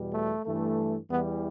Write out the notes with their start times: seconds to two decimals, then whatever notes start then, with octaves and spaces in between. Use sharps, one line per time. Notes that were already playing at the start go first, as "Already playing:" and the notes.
Already playing: E2 B2 G3
0.13 A3
0.45 G2 E3 A3
1.10 E2 E3 G3 B3